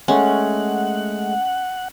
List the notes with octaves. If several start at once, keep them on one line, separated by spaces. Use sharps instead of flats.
G#3 A3 C#4 F#5